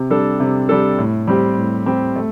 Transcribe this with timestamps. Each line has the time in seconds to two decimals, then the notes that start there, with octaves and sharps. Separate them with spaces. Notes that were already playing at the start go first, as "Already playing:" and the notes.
Already playing: C3
0.10 G3 D4 A4
0.40 C3
0.69 G3 D4 A4
0.98 A2
1.27 G3 C4 G4
1.57 A2
1.86 G3 C4 G4
2.16 A3